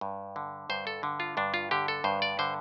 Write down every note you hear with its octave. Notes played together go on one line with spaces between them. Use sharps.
G2
D3
G2 C5
A4
D3
F4
G2 D4
F4
D3 G4
A4
G2 C5
D5
D3 C5